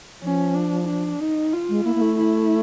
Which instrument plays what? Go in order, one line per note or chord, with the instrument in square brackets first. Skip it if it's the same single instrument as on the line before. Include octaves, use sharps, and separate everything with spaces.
[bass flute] F3 [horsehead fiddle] C#4
[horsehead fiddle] D4
D4
D#4
F4
[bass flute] G#3
[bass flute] A#3 [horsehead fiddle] E4
[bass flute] A#3
A3
[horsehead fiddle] E4